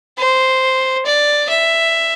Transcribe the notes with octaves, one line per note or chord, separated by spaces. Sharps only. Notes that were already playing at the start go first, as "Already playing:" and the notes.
C5
D5
E5